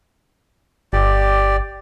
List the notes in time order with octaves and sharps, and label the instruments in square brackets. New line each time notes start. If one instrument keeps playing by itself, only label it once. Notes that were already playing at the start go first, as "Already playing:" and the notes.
[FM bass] G1 [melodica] G4 D5